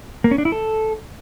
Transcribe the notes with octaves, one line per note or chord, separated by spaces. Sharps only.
A#3
C#4
D4
E4
A4